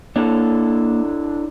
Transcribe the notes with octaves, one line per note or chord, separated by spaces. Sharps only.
A#3 D4 E4 A4 C#5